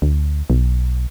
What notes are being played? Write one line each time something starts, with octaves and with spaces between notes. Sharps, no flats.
D2
B1